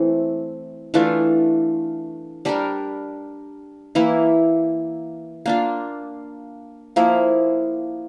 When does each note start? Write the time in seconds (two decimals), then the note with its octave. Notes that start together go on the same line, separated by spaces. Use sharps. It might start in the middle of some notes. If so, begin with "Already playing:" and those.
Already playing: E3 A3 C4
0.94 E3 A3 D4 F4
2.45 G3 D4 G4 A#4
3.95 E3 A#3 E4
5.46 A#3 D4 F4
6.96 F3 A#3 E4